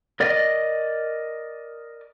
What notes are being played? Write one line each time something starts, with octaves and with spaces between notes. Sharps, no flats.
A#4 D5 D#5